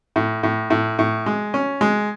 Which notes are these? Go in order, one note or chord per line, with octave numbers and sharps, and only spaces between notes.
A2
A2
A2
A2
G#3
C#4
G#3